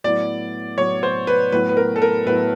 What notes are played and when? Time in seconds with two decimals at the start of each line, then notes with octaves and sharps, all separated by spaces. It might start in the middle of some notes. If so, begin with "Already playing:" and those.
0.04 A2 F#3 B3 E4 D5
0.78 A2 F#3 B3 E4 C#5
1.03 C5
1.27 B4
1.52 A2 F#3 B3 E4 B4
1.69 B4
1.77 A#4
1.96 A4
2.02 A#4
2.26 A2 F#3 B3 E4 B4